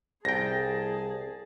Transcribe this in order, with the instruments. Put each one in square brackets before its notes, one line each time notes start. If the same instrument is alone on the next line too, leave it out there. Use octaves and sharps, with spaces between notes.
[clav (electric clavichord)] C2 G5 [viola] G#4 [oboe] A5 [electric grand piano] A#6